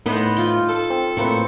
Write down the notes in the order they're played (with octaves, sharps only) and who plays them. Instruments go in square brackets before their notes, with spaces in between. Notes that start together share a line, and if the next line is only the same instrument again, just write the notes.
[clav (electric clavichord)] A2 [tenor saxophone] B3 [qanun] D#4 B4 C5
[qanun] F4 G5
[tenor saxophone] A4
[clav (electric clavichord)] C4
[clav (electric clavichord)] A2 A#3 B4 [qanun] C4 C#6